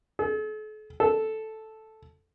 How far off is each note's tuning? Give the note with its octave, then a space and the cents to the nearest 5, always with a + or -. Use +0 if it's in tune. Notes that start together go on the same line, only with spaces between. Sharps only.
A4 -45
A4 -5